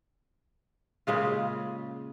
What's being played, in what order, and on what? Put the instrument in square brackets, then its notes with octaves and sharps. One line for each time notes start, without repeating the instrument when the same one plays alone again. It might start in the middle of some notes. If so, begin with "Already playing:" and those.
[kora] A#2 C#3 G#3 F4